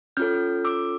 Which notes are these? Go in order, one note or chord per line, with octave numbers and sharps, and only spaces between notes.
C#4 F4 A4 F6 G6
D6 E6